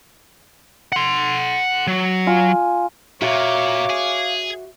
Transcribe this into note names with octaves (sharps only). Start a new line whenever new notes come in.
F#5 C6
F#3
F4 G#5
A#2 F#4 C#5 E5 F5 D6
G#4